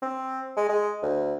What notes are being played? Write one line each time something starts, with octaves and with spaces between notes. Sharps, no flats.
C4
G#3
G#3
D2